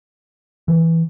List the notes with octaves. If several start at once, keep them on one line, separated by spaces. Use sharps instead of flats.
E3